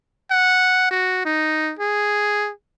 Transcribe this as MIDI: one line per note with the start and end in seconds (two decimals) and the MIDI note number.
0.31 0.87 78
0.91 1.22 66
1.25 1.74 63
1.79 2.51 68